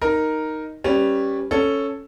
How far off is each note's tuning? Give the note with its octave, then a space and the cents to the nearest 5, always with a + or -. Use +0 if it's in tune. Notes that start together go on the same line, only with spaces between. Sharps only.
D#4 +0 A#4 +0
G3 +0 C#4 -10 B4 +0
C#4 +0 A4 +0